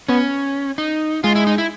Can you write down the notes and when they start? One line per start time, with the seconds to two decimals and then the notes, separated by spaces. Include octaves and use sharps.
0.09 B3 C#4
0.78 D#4
1.24 G#3 F4
1.35 E4
1.47 D#4
1.58 E4